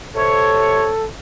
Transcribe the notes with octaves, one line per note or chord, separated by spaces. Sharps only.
C3 A4 C#5